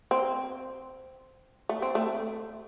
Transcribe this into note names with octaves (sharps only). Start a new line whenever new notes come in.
C4
A3
C4
A3